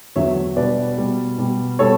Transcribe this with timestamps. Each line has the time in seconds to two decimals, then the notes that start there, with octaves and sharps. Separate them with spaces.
0.16 E2 D3 F#3 C#5 E5
0.56 B2 G3 B4 D5
0.98 B2 G3
1.38 B2 G3
1.79 B2 G3 A4 C#5